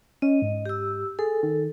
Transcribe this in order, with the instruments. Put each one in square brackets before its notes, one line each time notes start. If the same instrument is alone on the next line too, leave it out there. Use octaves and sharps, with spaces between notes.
[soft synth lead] C#4 [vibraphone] D#5
[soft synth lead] G#2
[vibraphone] G4 E6
[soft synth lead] G#4 [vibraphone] A4
[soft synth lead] D#3